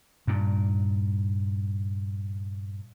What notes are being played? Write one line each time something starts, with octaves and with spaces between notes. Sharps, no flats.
G2 A#2